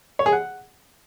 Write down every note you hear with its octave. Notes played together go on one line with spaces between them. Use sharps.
C#5
G#4
F#5